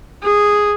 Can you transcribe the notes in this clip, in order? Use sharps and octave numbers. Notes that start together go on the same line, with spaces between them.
G#4